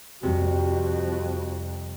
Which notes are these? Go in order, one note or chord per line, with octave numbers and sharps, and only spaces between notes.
F2 C3 G3 F#4